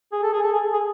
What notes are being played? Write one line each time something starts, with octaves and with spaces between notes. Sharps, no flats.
G#4
A4
G#4
A4
G#4
G#4